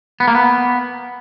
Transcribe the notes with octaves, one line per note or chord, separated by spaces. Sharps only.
B3
A#3
B3